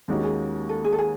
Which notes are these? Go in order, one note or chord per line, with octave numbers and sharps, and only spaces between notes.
D#2 D#3 G#3 C#4 D4 F#4
G#4
A4
G#4
A4
G#4